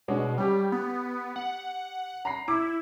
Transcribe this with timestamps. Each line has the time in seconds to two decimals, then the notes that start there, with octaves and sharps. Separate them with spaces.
0.08 B2 G#3 C#4 D4
0.38 G3 C#4 G4
0.72 B3
1.36 F#5
2.25 A#5 B5 C7
2.48 E4 D6